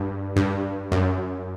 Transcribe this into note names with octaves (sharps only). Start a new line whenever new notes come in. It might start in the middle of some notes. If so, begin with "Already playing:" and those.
Already playing: G2
G2
F#2